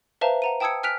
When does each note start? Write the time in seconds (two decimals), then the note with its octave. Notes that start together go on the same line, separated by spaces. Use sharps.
0.21 B4 C5 E5 F5 A5 A#5
0.42 F#5 A#5 D#7
0.60 G5 A5 D#6 E6 G#6 C#7
0.83 G#5 F6 F#6 B6 D7 F7